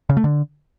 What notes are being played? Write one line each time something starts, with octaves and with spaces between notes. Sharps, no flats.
C#3
A3
D3